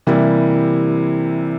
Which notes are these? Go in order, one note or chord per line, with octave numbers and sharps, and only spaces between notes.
C3 E3 G3 A#3 E4